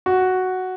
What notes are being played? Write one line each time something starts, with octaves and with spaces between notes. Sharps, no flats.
F#4